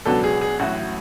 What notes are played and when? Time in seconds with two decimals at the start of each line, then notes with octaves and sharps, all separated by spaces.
0.05 C#2 B2 F#3 B3 D4 A4
0.24 G#4
0.41 G#4
0.59 A1 A2 F#3 F#4